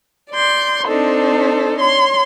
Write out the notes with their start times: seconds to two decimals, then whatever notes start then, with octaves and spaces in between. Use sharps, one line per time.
0.32 D5 C6 G6
0.87 C4 D4 D#4 A4 C5
1.78 C#5 C6